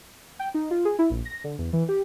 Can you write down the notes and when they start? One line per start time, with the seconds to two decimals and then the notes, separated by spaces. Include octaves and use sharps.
0.39 G5
0.54 D#4
0.71 F4
0.85 G#4
0.99 E4
1.10 A#1
1.25 A#6
1.44 D3
1.59 E2
1.73 E3
1.89 G4